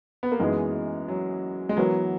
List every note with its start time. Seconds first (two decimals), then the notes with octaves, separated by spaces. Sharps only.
0.23 B3
0.32 A#3
0.40 F#2 E3 G#3 B3 D#4 G#4
1.08 F#3
1.69 G#3
1.77 E3 F#3 B3 F#4 A#4